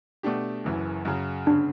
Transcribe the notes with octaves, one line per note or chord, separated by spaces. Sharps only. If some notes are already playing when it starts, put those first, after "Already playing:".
B2 A3 D4 G4
F#1 F#2 E3
F#2 C#3 F#3
G1 C#3 D4